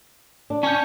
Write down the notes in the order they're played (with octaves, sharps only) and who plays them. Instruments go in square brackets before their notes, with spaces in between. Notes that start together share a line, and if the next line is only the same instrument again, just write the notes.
[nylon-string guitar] D4
[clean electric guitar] C#4 G#5 [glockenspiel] A5 G6